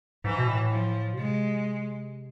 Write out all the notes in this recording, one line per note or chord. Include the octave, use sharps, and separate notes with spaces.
G#2 E3
B2
A2
F3
B2
C3 G#3